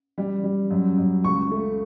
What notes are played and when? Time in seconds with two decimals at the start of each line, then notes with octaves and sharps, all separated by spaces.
0.18 G3
0.44 G3
0.71 F#2
0.98 F#2
1.24 C#2 C#6
1.51 A3